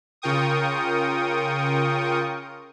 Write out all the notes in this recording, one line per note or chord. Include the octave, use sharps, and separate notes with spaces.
C#3 F4 A#4 G5 C#6 D#6